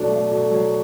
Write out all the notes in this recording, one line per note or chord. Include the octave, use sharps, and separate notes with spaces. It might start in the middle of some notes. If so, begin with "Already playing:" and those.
Already playing: B2 F#3 A3 D4
A3
B2
F#3